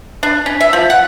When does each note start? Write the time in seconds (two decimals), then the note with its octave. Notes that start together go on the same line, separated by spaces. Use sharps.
0.23 D4
0.46 C#4
0.60 E5
0.73 F3
0.90 F#5